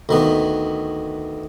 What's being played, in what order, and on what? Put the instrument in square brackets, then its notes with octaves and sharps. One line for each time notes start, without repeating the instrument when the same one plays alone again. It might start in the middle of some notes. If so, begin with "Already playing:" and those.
[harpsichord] D2 D#3 B3